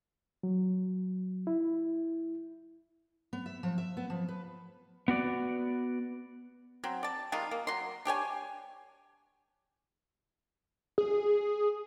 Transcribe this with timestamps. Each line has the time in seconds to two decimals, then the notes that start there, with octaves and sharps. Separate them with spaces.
0.43 F#3
1.47 E4
3.33 B3
3.46 E5
3.63 F3
3.78 E5
3.97 B3
4.10 F3
4.28 B4
5.08 B3 F#4 D5
6.84 F#3 C4
7.03 D5 A5
7.32 D#3 G3 G#3 F4
7.51 A#3
7.67 F#3 C6
8.05 D4 G4 C#5 G#5
10.98 G#4